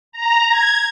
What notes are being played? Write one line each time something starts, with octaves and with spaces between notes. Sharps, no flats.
A#5
G#6